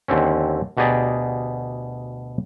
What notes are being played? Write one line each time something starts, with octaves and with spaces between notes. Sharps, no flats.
D#2 D3 C4 C#4
D2 B2 G4 G#4 D5 A#5